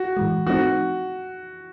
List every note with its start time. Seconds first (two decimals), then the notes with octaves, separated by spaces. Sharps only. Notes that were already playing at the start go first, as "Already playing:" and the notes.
Already playing: F#4
0.17 A2 E3 G#3
0.47 F3 A3 C4 D#4 F#4